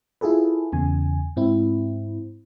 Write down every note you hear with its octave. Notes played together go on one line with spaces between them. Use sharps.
E4 F4 G#4 A4 B4
E2 C#3 G#5
G#2 C4 E4